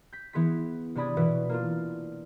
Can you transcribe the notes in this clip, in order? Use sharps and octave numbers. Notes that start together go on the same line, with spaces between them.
G6 B6
E3 B3 G#4 C6 B6
C3 D4 D5 B5 D#6 G#6
B2 E3 F#4 B4
A#3 D4 F4